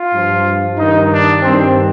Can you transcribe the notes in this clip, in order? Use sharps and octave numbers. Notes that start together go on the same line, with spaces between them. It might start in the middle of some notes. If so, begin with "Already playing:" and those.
Already playing: F4
G2 F3
G2 D#3 D#4
D4
G2 D#3 C4